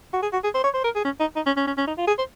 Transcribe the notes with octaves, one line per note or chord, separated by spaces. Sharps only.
F#4
G#4
F#4
G#4
C5
C#5
C5
A#4
G#4
C#4
D#4
D#4
C#4
C#4
C#4
C#4
D#4
F4
G#4
C5